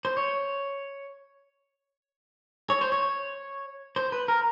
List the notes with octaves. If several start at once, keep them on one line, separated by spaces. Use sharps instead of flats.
C5
C#5
C#5
C5
C#5
C5
B4
A#4